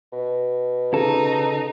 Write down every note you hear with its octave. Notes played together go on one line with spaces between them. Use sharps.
B2
C#3 D#4 A4